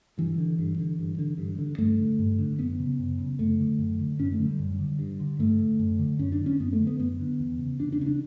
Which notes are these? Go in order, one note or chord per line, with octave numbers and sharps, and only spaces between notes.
G2 E3
D3
G2
D3
G2
D3
G2
D3
G2 A3
D3
G2
D3
F#2 B3
C#3
F#2
C#3
F#2 A3
D3
F#2
D3
F#2 C#4
A3
D3
G3
F#2
D3
G2
D3
G2 A3
D3
F#2
D3
F#2 C#4
D4
D3
C#4
F#2 B3
A3
D3
B3
F#2 B3
D3
E2
C#3
E2 D4
D4
C#3 C#4
D4